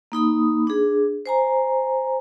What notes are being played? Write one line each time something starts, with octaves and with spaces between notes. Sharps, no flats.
A#3 D#4 B5 D#6
D4 G#4
C5 G#5 A#5